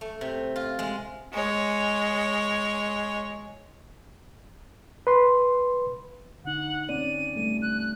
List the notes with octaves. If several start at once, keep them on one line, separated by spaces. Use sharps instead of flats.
A3
C3
F4
G#3
G#3 C#5
B4 C6
D3 D#4 F#5
C4 C#4 D5 D#7
G3 A3 D#7
F#6